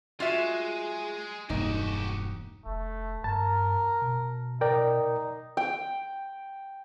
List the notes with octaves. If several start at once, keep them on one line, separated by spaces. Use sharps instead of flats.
G#3 F4 F#4 E5
E1 G2 A#3 D#4 F#4 G4
F1 A3
G2 A#4 A5
B2
D#4 A#4 D5 G5
G5